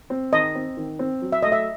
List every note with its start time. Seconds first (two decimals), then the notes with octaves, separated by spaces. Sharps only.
0.10 C4
0.33 D#3 D#5
0.55 C4
0.77 D#3
0.99 C4
1.22 F#3
1.32 E5
1.42 A3 D#5
1.52 E5